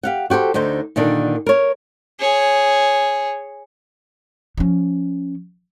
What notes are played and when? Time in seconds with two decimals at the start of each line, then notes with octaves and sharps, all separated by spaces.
0.03 G4 F5 F#5
0.30 F#4 G4 A4 C5
0.54 D2 D3 D#4 C5
0.96 A#2 D3 D#3 D4
1.46 A#4 C#5
2.20 G#4 C#5
4.57 F3 C#4